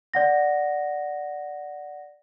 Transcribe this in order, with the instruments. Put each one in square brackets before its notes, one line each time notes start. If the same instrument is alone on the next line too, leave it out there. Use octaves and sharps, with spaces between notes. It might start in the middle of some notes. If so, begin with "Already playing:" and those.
[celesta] D5 F#5 A#6